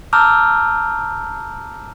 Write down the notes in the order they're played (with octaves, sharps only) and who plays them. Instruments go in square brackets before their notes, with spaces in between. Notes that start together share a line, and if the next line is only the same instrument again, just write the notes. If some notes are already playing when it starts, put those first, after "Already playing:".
[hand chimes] A5 A#5 D6 E6 F6 G6